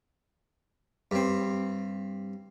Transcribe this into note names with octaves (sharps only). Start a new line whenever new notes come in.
G2 C4